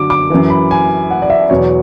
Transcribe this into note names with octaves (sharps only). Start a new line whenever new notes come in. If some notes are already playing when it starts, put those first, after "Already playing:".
Already playing: D3 F#3 D6
D6
F#2 E3
B5
G#5
F#5
D5
E5
E2 B2 F#3 C#5